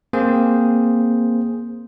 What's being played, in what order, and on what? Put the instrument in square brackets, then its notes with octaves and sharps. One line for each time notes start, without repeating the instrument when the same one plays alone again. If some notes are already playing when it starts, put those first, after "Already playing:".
[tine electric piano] A#3 C4 G#4 C5